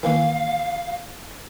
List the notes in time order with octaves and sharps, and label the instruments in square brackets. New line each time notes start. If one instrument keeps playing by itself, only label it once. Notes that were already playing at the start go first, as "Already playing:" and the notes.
[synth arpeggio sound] D#3 E3 A#3 [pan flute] F5